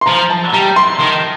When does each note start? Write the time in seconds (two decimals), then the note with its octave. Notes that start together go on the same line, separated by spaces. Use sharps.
0.01 C6
0.06 F3 A#5
0.30 A5
0.53 G3 A#5
0.76 C6
0.99 D#3